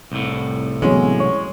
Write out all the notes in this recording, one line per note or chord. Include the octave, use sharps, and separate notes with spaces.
C2 A2
B2 E3 F#3 G#3 B3 C#4
C#5 C#6